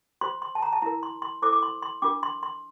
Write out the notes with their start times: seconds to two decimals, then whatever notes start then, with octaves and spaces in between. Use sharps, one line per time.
0.21 F4 C5 C6
0.42 C6
0.55 A5
0.62 A#5
0.73 A5
0.82 E4 A#4 A#5
1.03 C6
1.22 C6
1.42 E4 A4 C5 D6
1.53 D6
1.63 C6
1.82 C6
2.02 D4 F4 A#4 D6
2.23 C6
2.43 C6